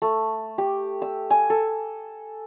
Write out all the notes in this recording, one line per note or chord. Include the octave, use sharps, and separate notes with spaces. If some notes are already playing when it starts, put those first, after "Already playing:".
A3
G4
E6
G#5
A4